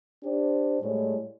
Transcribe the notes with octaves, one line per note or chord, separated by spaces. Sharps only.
D4 G4 C5
A2 G3 G#3 C#5